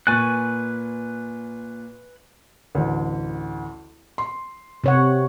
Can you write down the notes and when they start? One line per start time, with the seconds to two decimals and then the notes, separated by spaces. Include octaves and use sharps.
0.07 A#2 B4 G#5 C#6 F#6 A6
2.75 A1 D2
4.18 C6
4.84 C3 C#5 F#5